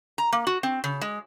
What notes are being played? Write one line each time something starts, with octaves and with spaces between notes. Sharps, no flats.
A#5
A#3
F#4
C4
C#3
G#3